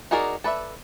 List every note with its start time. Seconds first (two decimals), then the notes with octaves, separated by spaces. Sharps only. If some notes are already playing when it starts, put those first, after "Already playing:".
0.11 D#4 F#4 G#4 A#4 D5
0.44 A4 B4 D5 E5